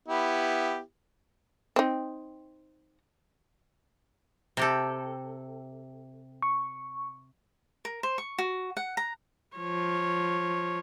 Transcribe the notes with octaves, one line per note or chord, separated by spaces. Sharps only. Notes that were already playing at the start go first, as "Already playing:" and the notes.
B3 E4 G4
C4 D#4
C3 G4 A4
C#6
A#4
C5
C#6
F#4
F#5
A#5
F3 C#5